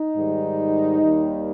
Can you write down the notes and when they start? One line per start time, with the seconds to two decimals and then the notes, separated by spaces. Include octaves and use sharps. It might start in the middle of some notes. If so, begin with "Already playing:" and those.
Already playing: D#4
0.15 G#2 D#3 G3
1.01 D#2 D#3 G3